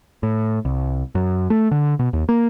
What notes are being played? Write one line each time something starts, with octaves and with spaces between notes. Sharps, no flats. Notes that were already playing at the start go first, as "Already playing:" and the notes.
A2
C2
F#2
A3
D3
B2
D#2
A#3